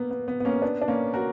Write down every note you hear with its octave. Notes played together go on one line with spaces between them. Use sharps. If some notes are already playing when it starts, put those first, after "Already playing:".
Already playing: A#3 B3
B3
B3
B3
A#3 C#4
B3 D4
D4
A#3 C#4
F#4 A#4